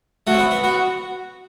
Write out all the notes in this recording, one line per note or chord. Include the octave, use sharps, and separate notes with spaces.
A3 F#4
C4
B3
B3
B3 F#4